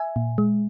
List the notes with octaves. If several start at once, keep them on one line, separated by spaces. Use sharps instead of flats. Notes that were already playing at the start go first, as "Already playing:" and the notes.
Already playing: E5 G#5
A#2
G#3